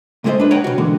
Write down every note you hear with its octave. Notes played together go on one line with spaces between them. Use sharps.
C#2 A#2 G#3 A3 C5 D#5
D4 B4
C#5 F#5 G5 A#5
B2 F#4
D3 E3 G#3 A#3